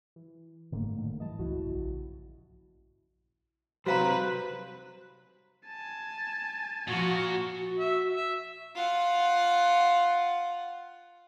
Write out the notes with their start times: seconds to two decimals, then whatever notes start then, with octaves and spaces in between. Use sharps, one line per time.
0.16 E3
0.72 F#1 G#2 D3 D#3 A3 A#3
0.96 A2 D3 D#3
1.20 E3 G3 D#5 A5
1.39 C#2 G2 C#3 E4 F#4
1.62 A#1
3.86 C3 F#3 G3 F#4 B4 C5 F5 A#5
5.66 G#5 A5
6.88 A#2 F3 F#4
7.59 F#4
7.79 E5
8.16 E5
8.76 F4 F#5